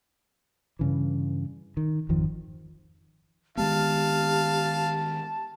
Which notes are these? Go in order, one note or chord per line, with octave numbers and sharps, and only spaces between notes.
G2 C#3 E3
D#3
G#1 F2 D#3 F3
D#3 G#3 B3 G4 F5 A5